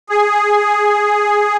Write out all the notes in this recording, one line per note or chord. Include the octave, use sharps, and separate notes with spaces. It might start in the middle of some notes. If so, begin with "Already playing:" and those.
G#4